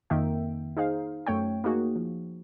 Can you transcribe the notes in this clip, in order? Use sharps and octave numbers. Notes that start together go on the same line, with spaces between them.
F2 D#3 A#3 E5 G5
D#4 G#4 C5 F5
F#2 A3 C#5 G5
A#3 D#4 F#4 G#4
F3